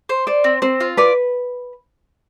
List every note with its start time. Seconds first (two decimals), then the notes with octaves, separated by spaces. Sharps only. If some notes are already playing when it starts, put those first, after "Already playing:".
0.09 C5
0.27 C5 D5
0.44 C4
0.62 C4 C5
0.80 F4
0.97 B4 D5